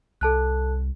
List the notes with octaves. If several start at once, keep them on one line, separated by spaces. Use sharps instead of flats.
C2 A4 A5 F#6